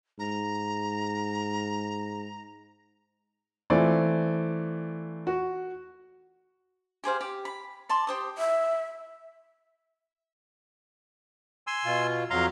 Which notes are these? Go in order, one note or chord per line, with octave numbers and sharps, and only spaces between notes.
G#2 A#5
E3 A3 C4 F4 D5
F#4
G4 G#4 C5 F5
G4
B5
D5 A5 C6
G4 C5 D#6
E5
G#5 C6 E6
B2 F4
F2 F#3 F5 A#5 C6